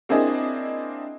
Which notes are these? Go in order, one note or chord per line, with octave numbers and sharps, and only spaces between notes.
A#3 C4 D4 E4 G#4 D#5